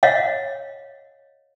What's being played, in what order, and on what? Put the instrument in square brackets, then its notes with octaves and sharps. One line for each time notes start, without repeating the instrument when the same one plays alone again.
[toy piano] C#5 D#5 F5 F#5